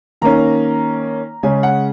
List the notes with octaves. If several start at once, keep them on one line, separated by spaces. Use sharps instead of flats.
D#3 A#3 C#4 A#5
C#3 G#3 C#4 G#5
F#5